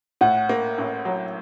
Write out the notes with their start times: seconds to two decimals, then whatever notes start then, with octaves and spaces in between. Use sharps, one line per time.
0.21 A2 F#5
0.49 A#3
0.78 A1
1.05 F#3